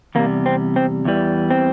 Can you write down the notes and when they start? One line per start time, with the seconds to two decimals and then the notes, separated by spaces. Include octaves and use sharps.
0.15 E2 C3 G3 A#3
0.46 C4
0.76 C4
1.05 E2 E3 G3
1.50 C4